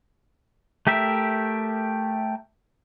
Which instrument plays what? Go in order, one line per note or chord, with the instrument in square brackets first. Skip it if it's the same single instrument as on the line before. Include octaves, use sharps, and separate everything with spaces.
[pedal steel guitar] A3 G4 A#4 E5